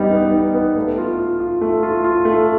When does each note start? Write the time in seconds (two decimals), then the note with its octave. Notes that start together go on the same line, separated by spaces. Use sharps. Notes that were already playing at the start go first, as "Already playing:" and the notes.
Already playing: G3 B3 D#4
0.12 B3
0.33 D#4
0.55 B3
0.76 A3
0.98 F4
1.19 F4
1.40 F4
1.61 A3
1.83 F4
2.04 F4
2.25 A3